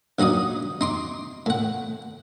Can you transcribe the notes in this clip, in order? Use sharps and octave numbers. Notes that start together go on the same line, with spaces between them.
A#1 F#3 D#4 D5 D#6
D#4 C6 D6
A2 F#5